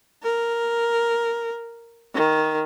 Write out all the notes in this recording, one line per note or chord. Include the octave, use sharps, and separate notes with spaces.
A#4
D#3